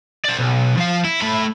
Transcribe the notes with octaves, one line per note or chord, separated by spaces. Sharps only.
C5 D5
B1
F3 F5
E4
A3 B5